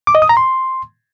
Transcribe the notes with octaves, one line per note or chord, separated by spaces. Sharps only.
D6
D#5
D#6
A#5
C6